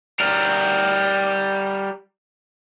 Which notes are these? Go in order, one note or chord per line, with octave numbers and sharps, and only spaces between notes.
G3 A#4